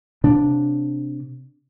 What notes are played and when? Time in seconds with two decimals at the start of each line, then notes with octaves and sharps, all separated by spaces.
0.24 C3 D4